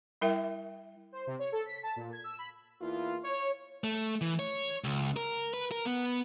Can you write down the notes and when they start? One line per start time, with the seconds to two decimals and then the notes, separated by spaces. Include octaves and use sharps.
0.21 G3 E4 A#4 E5 G5
1.12 C5
1.27 C3
1.39 C#5
1.52 A4
1.66 B6
1.83 A5
1.96 A#2
2.13 G#6
2.24 E6
2.39 B5
2.81 E2 A#3 E4 F4
3.24 C#5
3.84 A3
4.21 E3
4.39 C#5
4.84 C#2
5.17 A#4
5.54 B4
5.72 A#4
5.86 B3